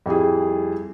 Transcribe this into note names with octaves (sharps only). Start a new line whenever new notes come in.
F2 G3 E4 G#4